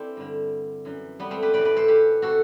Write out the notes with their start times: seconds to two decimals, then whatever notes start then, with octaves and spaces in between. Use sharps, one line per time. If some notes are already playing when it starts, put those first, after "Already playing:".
Already playing: E3 C4 D4 E4 A4 C5 D5
0.17 G2 D3
0.85 F#2 E3
1.20 G3 B3
1.30 A3 C4
1.42 G4 B4
1.53 A2 E3 B4 D5
1.65 B4 D5
1.76 A4 C5
1.88 G4 B4
2.22 C3 E3 F#4 A4